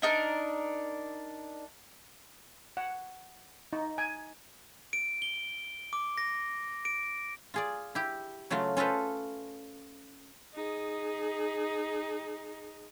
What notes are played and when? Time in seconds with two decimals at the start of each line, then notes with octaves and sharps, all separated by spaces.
0.02 D4 D#4 A#4 D5
2.77 F#5
3.73 D#4
3.98 G#5
4.93 D7
5.22 G7
5.93 D6
6.18 A#6
6.85 D7
7.54 F4 G#4 D5
7.95 E4 G4
8.50 C#3 F#3 A3 F4
8.77 C#4 F4 A4 B4 C5
10.54 D#4 G#4